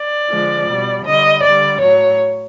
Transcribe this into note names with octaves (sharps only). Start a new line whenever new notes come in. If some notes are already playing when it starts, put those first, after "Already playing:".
Already playing: D5
D3 F3 G#3
B2 G3
D3 G3 D#5
D3 G3 D5
A2 F#3 C#5